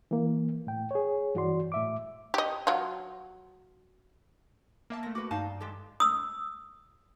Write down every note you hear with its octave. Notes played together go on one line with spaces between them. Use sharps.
E3 A#3
A2 G5
G#4 C#5
G2 E3 F#4 D5 C6
A2 E5 D6
G4 D#5
F#3 F4
A#3 E5 A5
A#2 A3 A#6
F#4 A4 B4 D6
G2 D#4 F5 A5
G#3 G4 A4
D#6 E6